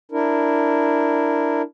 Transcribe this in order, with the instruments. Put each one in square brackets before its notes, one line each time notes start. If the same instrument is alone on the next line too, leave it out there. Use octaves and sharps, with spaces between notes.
[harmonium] D4 E4 A#4